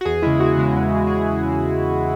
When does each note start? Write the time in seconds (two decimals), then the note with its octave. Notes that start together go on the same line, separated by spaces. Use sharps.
0.01 F#4
0.05 E2 G#4
0.22 C#3 G#3 E4
0.39 E2 F#4
0.57 C#3 G#3
0.74 E2
0.90 C#3 G#3
1.07 G#4